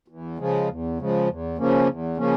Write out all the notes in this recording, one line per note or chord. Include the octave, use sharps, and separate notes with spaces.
E2
C#3 F3 G#3
E2
C#3 F3 G#3
E2
C#3 F3 A#3 C#4
E2
C#3 F3 A#3 C#4